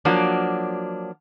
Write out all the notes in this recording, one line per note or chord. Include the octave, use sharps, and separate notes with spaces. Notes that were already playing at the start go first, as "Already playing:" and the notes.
F3 F#3 A#3 D4